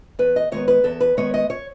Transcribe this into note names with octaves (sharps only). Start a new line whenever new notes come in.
E2 B4
D#5
D#3 G#3 B3 C#5
B4
E2 A4
B4
D#3 G#3 B3 C#5
D#5
C#5